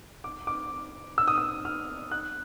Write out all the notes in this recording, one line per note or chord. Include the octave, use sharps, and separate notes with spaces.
D6
D6
E6
D#6
E6
F6
F#6